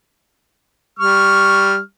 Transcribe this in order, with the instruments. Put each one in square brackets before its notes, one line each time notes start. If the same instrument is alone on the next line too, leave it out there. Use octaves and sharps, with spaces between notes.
[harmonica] G3 C#6 F6